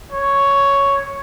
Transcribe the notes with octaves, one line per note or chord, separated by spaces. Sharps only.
C#5